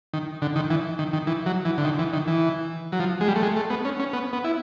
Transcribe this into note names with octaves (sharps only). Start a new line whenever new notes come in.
D#3
D3
D#3
E3
D#3
D#3
E3
F#3
E3
D3
D#3
E3
D#3
E3
F#3
F3
G#3
G3
A3
G#3
A3
B3
C#4
C#4
B3
B3
E4